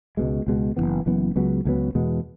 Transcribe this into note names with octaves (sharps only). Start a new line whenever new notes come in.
C#2 B2 G#3
C#2 B2 G#3
F#1 F#2 E3 B3
F#1 F#2 E3 B3
C#2 C#3 F#3 B3
C#2 C#3 F#3 B3
E2 B2 G#3 B3